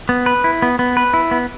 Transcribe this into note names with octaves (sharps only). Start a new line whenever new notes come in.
B3
B4
E4
B3
B3
B4
E4
B3